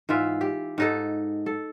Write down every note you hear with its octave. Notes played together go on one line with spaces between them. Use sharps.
G#2 E3 F4 E5
G4
G#2 D#4 A4
A4